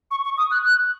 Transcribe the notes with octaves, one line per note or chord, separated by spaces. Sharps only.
C#6
C#6
D#6
F#6
F#6